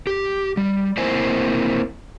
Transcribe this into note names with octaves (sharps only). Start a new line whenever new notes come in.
G4
G3
A#3 C4 E4 C5 G#5